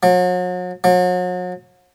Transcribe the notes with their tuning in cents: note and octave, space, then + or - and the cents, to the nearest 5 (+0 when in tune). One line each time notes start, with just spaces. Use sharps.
F#3 -40
F#3 -40